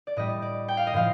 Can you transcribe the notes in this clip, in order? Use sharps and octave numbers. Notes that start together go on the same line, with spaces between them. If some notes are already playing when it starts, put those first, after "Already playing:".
D5
A2 G3 D#5
D5
G5
F5
D#5
A2 F3 F5